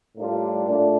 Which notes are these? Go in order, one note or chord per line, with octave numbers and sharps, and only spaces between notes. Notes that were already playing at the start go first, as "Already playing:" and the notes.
A2 G3 A#3 D4 F4
A#2 A3 D4